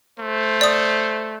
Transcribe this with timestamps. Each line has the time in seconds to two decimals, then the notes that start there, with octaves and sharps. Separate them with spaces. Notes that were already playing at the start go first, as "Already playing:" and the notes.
0.19 A3 C5
0.61 D5 D#6